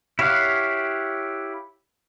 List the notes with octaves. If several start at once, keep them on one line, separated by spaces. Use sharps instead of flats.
E4 G4 C#5 F5 F#5